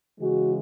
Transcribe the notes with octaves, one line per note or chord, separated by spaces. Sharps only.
C#3 E3 G#3 F#4